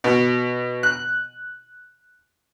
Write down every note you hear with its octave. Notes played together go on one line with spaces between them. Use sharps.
B2
F#6